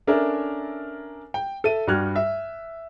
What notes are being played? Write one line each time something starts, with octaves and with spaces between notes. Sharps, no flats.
C#4 D4 A4 A#4 E5 G#5
G5
A4 E5 D#7
G2 G3 F#4 F6 F#6 G#6
E5